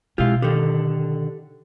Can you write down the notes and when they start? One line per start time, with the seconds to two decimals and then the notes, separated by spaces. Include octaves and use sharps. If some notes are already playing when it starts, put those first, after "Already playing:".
0.18 B2 G#3 C4 E4 F4 G4 F5
0.42 D3 D#3 G4 A4